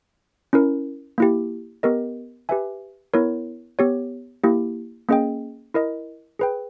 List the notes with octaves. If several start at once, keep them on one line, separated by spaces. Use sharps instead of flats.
C#4 E4 A#4
A#3 E4 G4
B3 G4 A#4 D#5
G4 B4 E5 G#5
B3 E4 A#4 C#5
B3 G4 C#5
A#3 E4 G4
A#3 C#4 G#4 D#5 G5
E4 A#4 D#5
G#4 B4 G5